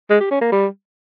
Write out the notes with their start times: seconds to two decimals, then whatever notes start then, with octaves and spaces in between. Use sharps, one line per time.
0.10 G#3
0.20 G4
0.31 C#4
0.41 A#3
0.52 G3